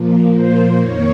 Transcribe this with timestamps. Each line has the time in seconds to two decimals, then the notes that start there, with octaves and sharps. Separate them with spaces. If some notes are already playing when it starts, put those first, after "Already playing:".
Already playing: A#2 F3 A#3
0.35 C5
0.79 F2 D#3 A#3 C#5